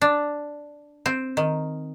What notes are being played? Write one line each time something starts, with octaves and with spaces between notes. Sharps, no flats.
D4
C4
D#3